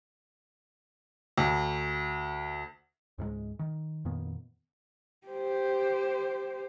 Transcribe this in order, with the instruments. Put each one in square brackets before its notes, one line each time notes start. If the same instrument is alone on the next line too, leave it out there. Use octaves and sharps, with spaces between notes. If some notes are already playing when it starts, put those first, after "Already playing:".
[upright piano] D2
[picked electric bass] C#2 G#2 F3 G#3
D#3
F2 A#2 D#3 B3
[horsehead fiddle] G4 C5